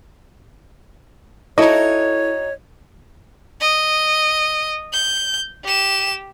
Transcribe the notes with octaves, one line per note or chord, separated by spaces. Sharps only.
D#4 E4 F#4 A4 C#5 D#5
D#5
G6
G4 E7